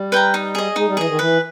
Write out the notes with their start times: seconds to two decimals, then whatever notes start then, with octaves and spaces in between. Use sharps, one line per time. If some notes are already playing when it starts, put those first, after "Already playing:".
Already playing: G3
0.12 B4 G5 A#5
0.34 D#4
0.55 G#4 D#5
0.76 G#3 D#4
0.87 G3
0.97 E3 G#4 D#5
1.08 D#3
1.19 E3 B4